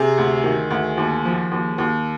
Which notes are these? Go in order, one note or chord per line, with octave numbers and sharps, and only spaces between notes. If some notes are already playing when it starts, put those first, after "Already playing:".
Already playing: C3 G#4
D2
D#3
D2
D#2
F3
D#2
D#2